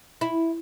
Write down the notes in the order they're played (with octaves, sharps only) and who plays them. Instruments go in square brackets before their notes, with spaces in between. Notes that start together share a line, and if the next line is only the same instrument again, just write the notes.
[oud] E4